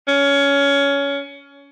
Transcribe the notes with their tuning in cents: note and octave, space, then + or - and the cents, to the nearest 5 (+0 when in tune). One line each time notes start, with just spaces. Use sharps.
C#4 +20